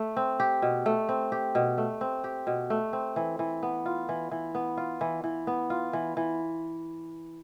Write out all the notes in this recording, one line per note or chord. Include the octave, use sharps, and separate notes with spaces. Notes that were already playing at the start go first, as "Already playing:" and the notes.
Already playing: A3
C4
G4
B2
A3
C4
G4
B2
A3
C4
G4
B2
A3
C4
E3
E3
B3
F4
E3
E3
B3
F4
E3
E3
B3
F4
E3
E3